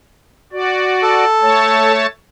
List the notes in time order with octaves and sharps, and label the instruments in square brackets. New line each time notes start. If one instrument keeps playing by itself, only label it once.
[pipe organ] F#4 D5
[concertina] A4
[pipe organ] A3 C#5 A5